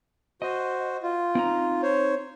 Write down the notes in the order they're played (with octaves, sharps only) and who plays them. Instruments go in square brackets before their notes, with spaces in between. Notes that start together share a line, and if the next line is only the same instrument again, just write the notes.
[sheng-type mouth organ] F#4 C5 [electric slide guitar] D#5
[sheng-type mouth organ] F4
[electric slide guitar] C4 D#4 A#5
[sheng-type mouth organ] C5 C#5